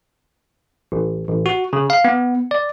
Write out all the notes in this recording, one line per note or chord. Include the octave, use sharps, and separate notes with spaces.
A1
A1
F#4
C#3
F5
B3
D5